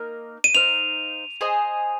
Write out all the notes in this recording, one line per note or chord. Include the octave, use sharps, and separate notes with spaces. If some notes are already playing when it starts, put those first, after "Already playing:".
Already playing: A#3 D#4 A#4
D#7
D#4 C5 F5 F7
G#4 C5 D#5 G#5